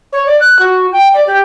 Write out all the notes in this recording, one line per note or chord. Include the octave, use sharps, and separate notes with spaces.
C#5
D5
F#6
F#4
G5
D5
G4